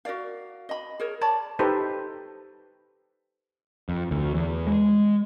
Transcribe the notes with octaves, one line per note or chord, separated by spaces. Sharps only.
F#4 A#4 D5 F5
D#5 B5
G#4 A#4 C#5
C#5 D5 A5 B5
D#4 G4 A4 B4 C5
F2
D2
E2
G#3